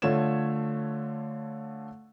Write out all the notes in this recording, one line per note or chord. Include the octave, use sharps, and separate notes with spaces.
D3 A3 F4 C#5 G#6 E7